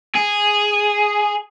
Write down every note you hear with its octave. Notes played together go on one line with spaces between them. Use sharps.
G#4